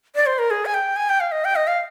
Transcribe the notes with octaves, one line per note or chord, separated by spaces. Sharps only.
D5
C5
A#4
G#4
G#5
G5
G#5
G5
F5
D#5
G5
D#5
F5